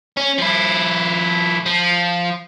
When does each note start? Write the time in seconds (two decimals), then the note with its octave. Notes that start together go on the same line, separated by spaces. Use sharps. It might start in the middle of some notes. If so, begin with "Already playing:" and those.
0.17 C#4
0.38 F3 E4
1.66 F3